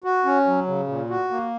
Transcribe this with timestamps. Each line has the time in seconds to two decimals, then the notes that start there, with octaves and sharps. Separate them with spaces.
0.04 F#4
0.25 C#4
0.47 F#3
0.67 C#3
0.88 A#2
1.10 F#4
1.31 A#3